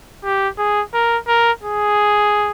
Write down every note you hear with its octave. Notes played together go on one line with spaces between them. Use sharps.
G4
G#4
A#4
A#4
G#4